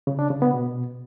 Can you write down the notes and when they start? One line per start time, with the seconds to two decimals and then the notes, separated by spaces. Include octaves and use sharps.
0.07 C#3
0.19 D4
0.30 C#3
0.42 B3
0.53 B2